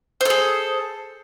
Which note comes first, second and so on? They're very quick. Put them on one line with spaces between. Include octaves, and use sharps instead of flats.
C5 A4 G#4